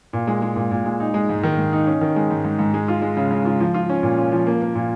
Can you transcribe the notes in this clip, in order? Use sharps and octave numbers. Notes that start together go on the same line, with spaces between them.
A#2
G#3
G#3
A#2
A#2
G#3
D#4
G#3
G#2
D#3
G#2
D#4
C#4
D#3
G#3
G#2
G#2
G#2
G#3
F4
G#3
C#3
C#3
F4
F3
F4
C#4
A#2
C#4
F3
A#3
A#3
A#2